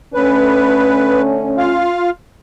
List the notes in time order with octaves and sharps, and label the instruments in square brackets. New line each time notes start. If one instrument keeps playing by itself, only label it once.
[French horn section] D3 A3 C#4 [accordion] B4
[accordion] F4 F5